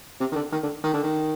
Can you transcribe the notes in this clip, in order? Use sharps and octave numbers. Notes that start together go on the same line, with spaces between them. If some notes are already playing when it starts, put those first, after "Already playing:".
C3
D#3
D3
D#3
D3
D#3
D3
D#3